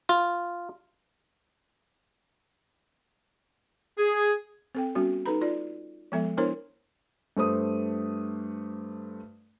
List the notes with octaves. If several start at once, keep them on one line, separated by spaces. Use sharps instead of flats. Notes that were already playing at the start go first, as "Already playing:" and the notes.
F4
G#4
C4 A4 G5
G3 B3 C#4 F#4
D#4 A4 B4 A#5 B5
F4 D5
F3 G#3 B3 A4 E5
B3 D4 E4 A#4 C5 C#5
G2 A3 C5 D#6